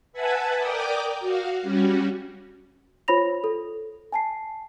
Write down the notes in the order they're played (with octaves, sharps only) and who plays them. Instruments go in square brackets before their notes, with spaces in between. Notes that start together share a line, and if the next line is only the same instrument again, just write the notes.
[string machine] B4 E5 F#5 G#5 A5 B5
A#4 D5 G5 D6 D#6 G6
F#4 F5
G3 C#4 F#4
[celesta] F4 C5 C#5 B5 A#6 F7
A4
G#5 A5 C7